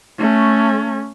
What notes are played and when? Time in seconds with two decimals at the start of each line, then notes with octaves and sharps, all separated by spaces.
0.19 A3 C#4